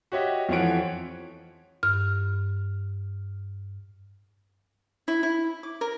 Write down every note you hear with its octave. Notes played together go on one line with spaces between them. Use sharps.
F#4 G4 C#5 D#5 E5
F2 E3 F3 C#5 F#5 D7
G2 F6
E4
E4
D6
A#4